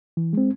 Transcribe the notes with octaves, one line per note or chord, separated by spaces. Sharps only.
E3
G#3 C4